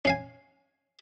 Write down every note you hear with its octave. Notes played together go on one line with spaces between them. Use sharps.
C#4 F5 G#5